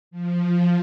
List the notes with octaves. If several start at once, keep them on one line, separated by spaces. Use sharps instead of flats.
F3